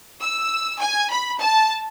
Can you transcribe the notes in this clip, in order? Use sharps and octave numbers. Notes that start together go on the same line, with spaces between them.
E6
G#5
B5
A5